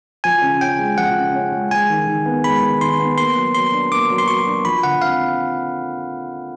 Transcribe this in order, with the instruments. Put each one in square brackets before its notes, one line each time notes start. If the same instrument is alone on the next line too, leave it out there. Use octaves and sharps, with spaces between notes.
[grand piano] F3 [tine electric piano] G#5
[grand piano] C#3
[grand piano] C#4 [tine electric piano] G5
[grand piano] G#3
[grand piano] F3 [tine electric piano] F#5
[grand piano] C#3
C#4
G#3
[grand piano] G#3 [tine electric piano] G#5
[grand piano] D#3
D#3
B3
[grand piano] G#3 [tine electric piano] B5
[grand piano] D#3
[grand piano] D#3 [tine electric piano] C6
[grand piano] B3
[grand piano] A#3 [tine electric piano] C6
[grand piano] F#3
[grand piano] F#3 [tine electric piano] C6
[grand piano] D4
[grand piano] A#3 [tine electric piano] D6
[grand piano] F#3
[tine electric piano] C6
[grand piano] F#3 [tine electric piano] C#6
[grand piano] D4
[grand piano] F3 [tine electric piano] B5
[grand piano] D3 [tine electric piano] F#5
[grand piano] C4 [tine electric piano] F5